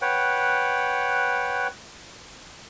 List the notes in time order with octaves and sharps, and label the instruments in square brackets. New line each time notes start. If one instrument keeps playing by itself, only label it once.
[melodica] B4 C#5 F#5 G5